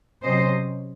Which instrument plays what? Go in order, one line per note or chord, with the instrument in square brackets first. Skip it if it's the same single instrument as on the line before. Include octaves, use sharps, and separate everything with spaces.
[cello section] C3 F#3 C#4 C5 D#5